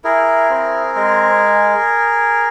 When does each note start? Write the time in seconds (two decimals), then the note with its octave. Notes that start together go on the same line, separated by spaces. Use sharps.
0.04 E4 G#4 A#4
0.50 C4
0.96 G#3